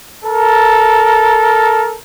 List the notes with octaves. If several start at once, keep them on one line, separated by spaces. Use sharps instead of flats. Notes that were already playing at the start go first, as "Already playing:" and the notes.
A4 A#4